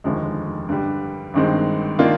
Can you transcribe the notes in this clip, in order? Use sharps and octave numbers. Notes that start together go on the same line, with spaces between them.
F1 D#2 D3 F3 G#3
G2 D3 G3
G#1 G2 D#3 G#3 C4
D#3 A#3 D4 F4